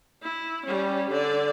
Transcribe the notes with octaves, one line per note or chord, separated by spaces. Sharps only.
E4
G3 C#4
D3 D5